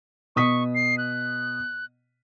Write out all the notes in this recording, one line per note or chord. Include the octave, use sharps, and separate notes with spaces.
B2 C#6 D#6 B6
C7
F#6